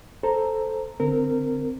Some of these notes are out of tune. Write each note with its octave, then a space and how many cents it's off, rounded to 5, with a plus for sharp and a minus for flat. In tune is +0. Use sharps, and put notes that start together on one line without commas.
A4 -5 C5 +0 A#5 -5
D3 +0 C4 -15 A#4 -20